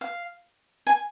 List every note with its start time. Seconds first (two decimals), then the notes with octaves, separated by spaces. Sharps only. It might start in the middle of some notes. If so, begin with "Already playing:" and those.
0.01 F5
0.87 G#5